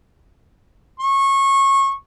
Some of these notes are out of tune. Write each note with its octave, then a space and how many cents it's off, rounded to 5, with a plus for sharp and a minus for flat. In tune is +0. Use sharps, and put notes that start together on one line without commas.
C#6 -25